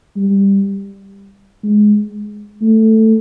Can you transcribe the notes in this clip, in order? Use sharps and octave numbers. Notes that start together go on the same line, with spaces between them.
G3
G#3
A3